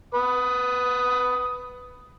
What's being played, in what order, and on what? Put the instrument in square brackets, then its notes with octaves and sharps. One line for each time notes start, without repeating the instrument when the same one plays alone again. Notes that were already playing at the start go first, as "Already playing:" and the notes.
[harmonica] B4 D#6